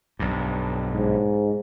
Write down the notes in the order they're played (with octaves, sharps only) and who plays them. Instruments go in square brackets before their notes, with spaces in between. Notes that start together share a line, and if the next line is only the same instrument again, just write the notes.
[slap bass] B1 G2
[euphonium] G#2